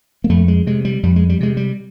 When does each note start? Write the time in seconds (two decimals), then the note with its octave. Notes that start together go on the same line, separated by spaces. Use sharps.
0.24 A#3
0.29 F2 A3
0.48 G#3
0.66 C3 G#3
0.85 G3
1.03 F2 G3
1.16 G#3
1.29 G3
1.40 C3 G#3
1.57 G3